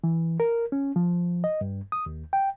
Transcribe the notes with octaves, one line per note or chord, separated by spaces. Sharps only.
E3
A#4
C#4
F3
D#5
G2
D#6
D#2
G5